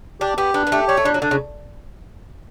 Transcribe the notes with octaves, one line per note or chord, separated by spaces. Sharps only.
D4 G4
B3 G4
B3 D4
B3
A3 G4
G3 C#5
A3
G3 D4
F#3
D3 D4
C#3